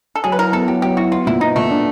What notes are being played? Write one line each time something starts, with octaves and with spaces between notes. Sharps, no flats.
A4
F#3 G#4
B4
E4 A#4
B3 A4
F#3 G4
F#3 G4
E4 F#4
B3 F4
A#2 E4
B3 D#4
A#2 A3
D4